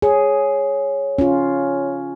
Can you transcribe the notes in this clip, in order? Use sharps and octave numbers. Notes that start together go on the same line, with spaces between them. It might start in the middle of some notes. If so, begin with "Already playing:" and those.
G#4 C#5
C#4 F4